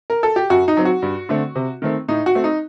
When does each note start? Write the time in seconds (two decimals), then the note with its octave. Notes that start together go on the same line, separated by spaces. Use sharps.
0.10 A#4
0.23 A4
0.36 G4
0.50 F#2 F#4
0.68 D#4
0.77 F#3 C4
0.85 F#4
1.02 G2
1.29 D3 A3 C4
1.56 C3
1.82 D#3 A3 C4
2.08 A2 D#4
2.26 F#4
2.35 A3 C4
2.44 D#4